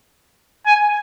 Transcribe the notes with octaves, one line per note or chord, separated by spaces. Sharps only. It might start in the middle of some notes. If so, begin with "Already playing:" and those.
G#5